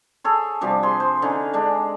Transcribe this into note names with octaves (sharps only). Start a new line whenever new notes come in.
G#4 A4 C#5
C3 F3 G3 D4
G#4 C6
C5
D3 C#4 D#4
G#3 D4